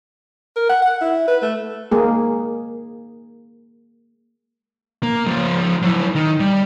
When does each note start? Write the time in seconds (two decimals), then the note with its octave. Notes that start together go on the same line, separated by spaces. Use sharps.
0.56 A#4
0.69 F#5
0.82 F#5
1.01 E4
1.28 B4
1.43 A3
1.91 G#3 A#3 G#4
5.03 A#3
5.27 C#2 F3
5.82 F#3 E4
6.16 D#3
6.40 G3